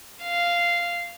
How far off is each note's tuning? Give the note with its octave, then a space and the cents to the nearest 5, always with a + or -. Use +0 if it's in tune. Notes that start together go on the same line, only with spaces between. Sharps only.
F5 -10